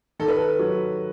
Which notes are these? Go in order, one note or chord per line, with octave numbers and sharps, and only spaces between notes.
D#3 A4
B4
A4
F#3